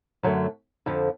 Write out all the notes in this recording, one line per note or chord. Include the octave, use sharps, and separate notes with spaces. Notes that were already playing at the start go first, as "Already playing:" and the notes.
F#2 D3 F#3 A3
F2 D3 F3